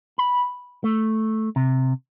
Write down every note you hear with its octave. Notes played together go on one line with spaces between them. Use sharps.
B5
A3
C3